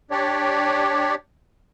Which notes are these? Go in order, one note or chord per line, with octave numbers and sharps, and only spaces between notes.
D4 G4 C#5 D5